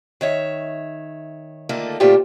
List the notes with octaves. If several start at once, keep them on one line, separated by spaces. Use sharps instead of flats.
D#3 C#5 E5
D3 D#3 A3 A#3 F4 A4
A#2 D3 A3 C4 F4 G4